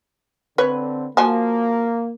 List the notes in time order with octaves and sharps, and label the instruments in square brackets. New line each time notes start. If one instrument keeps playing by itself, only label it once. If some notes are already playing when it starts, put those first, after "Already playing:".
[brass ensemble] D3 C4 [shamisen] B4 C#5
[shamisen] F3 F#4 G#5 [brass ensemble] A#3